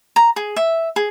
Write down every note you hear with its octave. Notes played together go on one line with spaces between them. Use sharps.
A#5
G#4
E5
G#4